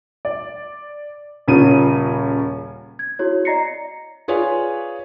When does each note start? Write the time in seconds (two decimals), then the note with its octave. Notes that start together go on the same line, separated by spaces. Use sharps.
0.25 D5
1.48 D#1 C#3 C#4 F4 D#7
2.99 G#6
3.19 E4 F#4 G#4 C#5
3.45 D5 D#5 A#5 A#6 C7 C#7
4.28 F4 G#4 B4 C#5 D5 G#5